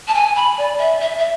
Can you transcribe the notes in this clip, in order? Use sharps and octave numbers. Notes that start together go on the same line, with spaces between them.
A5
G#5
B5
D5
E5
E5
E5